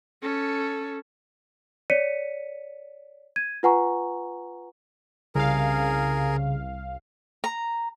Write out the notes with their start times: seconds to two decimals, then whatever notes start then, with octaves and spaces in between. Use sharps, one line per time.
0.23 C#4 A4
1.90 C#5 D5 B6 C#7 D#7
3.36 G#6 D#7
3.63 F4 B4 F#5 G#5 A#5 C#6
5.35 C2 C#3 G#4 A#4 F5
7.44 A#5